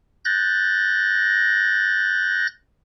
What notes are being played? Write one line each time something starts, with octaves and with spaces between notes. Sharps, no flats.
F#6 G6 A6 A#6